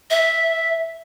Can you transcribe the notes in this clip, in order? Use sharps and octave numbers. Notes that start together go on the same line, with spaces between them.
E5